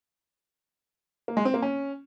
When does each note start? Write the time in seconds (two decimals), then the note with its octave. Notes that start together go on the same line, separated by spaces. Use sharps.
1.28 A#3
1.37 G#3
1.45 C4
1.54 A#3
1.62 C#4